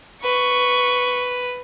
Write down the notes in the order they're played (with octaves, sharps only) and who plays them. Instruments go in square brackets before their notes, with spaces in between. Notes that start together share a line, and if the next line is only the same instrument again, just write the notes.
[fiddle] B4 [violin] C#6